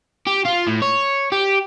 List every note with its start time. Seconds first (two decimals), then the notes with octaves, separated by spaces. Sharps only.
0.27 G4
0.45 F4
0.67 A2
0.82 C#5
1.32 G4